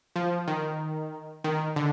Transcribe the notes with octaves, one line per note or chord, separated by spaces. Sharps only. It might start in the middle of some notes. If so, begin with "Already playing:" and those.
F3
D#3
D#3
D3